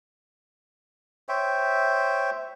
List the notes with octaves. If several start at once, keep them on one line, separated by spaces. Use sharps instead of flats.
C5 C#5 E5 G5